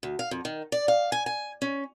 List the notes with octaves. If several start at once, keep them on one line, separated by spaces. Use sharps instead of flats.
D2
F5
F2
D#3
D5
F5
G#5
G#5
C#4